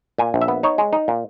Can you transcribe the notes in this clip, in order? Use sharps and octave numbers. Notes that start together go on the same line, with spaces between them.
A#2 G#5
A#1
E5
B3
D#4 C#5
G#3
D#4
A#2